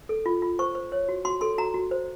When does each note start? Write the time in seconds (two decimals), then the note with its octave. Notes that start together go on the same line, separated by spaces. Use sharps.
0.09 A4
0.26 F4
0.42 F4
0.59 C5 C#6
0.75 C5
0.92 C#5
1.09 F#4
1.25 F#4 C6
1.41 A4 C6
1.58 F#4 A#5
1.74 F#4
1.91 C5